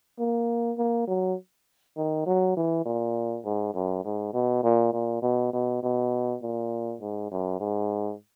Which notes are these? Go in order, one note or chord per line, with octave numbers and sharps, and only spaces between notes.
A#3
A#3
F#3
D#3
F#3
E3
A#2
G#2
F#2
G#2
B2
A#2
A#2
B2
B2
B2
A#2
G#2
F#2
G#2